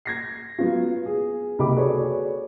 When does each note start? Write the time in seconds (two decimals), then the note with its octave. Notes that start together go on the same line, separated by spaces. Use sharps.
0.05 G#6 A#6 C7
0.59 F#3 B3 F4
1.06 G#4
1.59 F#1 C2 G4 D#5 B5 D6
1.75 F#4 G#4 A4 B4 C#5 D5